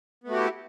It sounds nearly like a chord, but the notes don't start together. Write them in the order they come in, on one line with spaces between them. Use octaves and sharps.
B3 A3 F#4 G4 E4